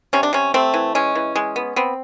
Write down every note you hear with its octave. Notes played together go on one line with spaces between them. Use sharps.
C3 C#4
D4
C3 C#4
A3 C4
E3
G#3 C#4
E3
G#3
B3
B3 C4